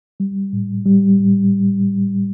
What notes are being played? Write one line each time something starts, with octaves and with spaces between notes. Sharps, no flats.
G3
A2
G3
A2